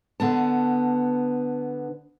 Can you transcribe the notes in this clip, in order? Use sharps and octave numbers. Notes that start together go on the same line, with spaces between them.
D3 B3 A5